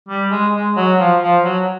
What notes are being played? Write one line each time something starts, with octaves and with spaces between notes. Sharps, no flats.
G3
G#3
G#3
F#3
F3
F3
F#3